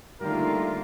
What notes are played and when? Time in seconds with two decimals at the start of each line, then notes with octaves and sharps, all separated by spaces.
0.21 D3 D#3 G3 A3 A#3 F4 A#4